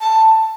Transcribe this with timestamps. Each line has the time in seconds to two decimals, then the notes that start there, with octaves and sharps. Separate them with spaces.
0.01 A5